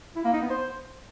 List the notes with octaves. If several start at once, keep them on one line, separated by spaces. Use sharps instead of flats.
E4
A#3
D#4
B3
C5